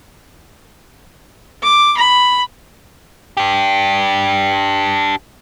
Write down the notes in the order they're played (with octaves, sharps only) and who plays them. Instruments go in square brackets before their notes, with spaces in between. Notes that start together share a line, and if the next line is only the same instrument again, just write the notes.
[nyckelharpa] D6
B5
[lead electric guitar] D4 G4